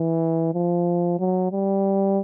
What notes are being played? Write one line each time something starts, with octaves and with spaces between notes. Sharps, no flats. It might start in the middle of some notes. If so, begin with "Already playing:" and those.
Already playing: E3
F3
F#3
G3